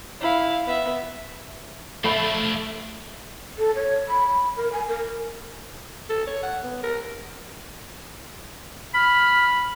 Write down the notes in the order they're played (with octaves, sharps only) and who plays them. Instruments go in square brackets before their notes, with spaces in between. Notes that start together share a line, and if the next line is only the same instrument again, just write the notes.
[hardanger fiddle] E4 F5
B3 E5
[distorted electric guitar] F3 D4 [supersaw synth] A3 [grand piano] E5 B5 C7
[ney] A4
C#5
B5
A#4
G#5
A#4
[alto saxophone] A4
C#5
F#5
B3
A#4
[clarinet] B5 [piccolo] F6